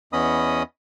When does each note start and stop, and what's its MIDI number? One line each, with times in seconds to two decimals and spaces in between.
0.13 0.63 40
0.13 0.63 59
0.13 0.63 61
0.13 0.63 75
0.13 0.63 83
0.13 0.63 87